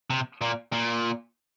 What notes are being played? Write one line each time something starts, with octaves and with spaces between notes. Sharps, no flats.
C3
A#2
A#2